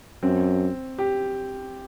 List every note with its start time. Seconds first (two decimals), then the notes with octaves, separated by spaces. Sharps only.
0.23 F#2 C4
0.99 G4